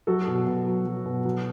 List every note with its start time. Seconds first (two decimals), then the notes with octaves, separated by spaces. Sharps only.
0.07 F#3 F#4 A4
0.27 B2
0.46 B2
0.66 F#3
0.86 F#3
1.05 B2
1.25 F#3